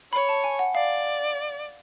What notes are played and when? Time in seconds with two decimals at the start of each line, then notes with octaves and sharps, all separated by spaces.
0.13 C#5 B5
0.29 A5
0.44 G#5
0.59 F#5
0.75 D5 F5